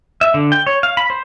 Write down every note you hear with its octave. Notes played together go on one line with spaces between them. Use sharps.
E5
D3
G5
C#5
F5
B5
C5